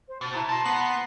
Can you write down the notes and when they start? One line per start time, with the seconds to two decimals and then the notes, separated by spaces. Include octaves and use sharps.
0.08 C5
0.21 B2 A6
0.34 E4 A5 A#5
0.49 B1 A5 C6 A6 A#6
0.65 B3 B6 C7 F#7